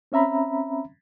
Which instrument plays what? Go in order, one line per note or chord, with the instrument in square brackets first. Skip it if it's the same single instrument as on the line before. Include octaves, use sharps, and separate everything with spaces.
[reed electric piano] C4 C#4 E5 A#5 B5